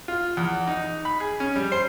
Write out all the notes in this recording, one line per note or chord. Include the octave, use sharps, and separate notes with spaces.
F4
E2
D#4
B5
G#4
C#4
G3
C5